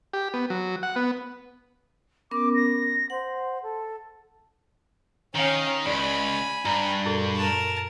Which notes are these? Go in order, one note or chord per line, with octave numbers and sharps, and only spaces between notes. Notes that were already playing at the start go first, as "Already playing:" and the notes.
G4
B3
F#3
F#5
B3
B3 C#4 A#4 D6
A#6
C5 F#5
A4
D#3 C#4 F5
C#2 D5 G#5 B5
G2 A#5
F#2 A#2 A4
A#4 A5